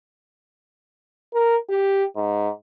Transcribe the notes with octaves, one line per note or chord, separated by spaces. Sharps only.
A#4
G4
G#2